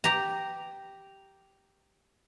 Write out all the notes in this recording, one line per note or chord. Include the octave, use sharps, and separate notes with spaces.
G4 A#5